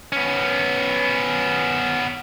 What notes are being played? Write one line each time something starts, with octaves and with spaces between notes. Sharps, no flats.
B3 C#4